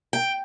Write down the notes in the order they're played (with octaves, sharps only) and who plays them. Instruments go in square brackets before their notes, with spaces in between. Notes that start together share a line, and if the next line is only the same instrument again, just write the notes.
[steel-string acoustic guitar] G5